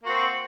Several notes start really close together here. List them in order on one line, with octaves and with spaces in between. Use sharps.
A#3 F#4 C4